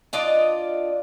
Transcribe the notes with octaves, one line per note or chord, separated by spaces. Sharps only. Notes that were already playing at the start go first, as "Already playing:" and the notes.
D4 F4 D5 D#5